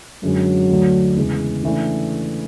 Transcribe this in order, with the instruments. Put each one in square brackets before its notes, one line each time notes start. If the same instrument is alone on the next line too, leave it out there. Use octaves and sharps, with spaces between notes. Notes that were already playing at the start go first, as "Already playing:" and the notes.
[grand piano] F#2 D3 G#3 C#4 [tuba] F#3
[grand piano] D2 D3 A3 D4
E2 C#3 E3 G#3
C#3 E3 A3 D4